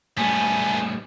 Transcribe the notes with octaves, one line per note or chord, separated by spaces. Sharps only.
A2 G3 A3 B3 G#5